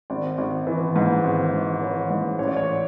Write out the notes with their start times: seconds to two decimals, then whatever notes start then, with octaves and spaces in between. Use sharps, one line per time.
0.10 G#1 D5
0.38 G#1
0.67 E3
0.96 G#2
1.24 G#1
1.53 G#1
1.81 E3 C#5
2.10 G#2
2.39 A1 C#5
2.47 D5
2.56 C#5